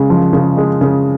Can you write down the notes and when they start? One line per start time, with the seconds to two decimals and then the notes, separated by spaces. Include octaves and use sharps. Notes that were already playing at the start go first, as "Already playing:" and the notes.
Already playing: C#3 G#3
0.10 F3
0.33 C#3
0.57 G#3
0.81 C#3